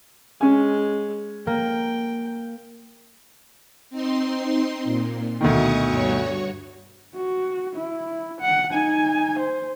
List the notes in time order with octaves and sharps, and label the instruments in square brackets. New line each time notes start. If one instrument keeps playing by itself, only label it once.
[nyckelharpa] G#3 [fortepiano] C#4 G#5
[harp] A#3 [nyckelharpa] G5
[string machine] C4 D#4 C6
A#2
[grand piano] D2 B2 D#3 [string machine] C#6 D#6
[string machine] G2 F#4 C#5
[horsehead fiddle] F#4
E4
F#5
D#4 G#5
C5